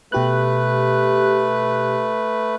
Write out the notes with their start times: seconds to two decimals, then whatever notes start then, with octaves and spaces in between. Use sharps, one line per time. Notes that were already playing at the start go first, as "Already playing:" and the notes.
0.12 B2 A3 G4 B4 F#6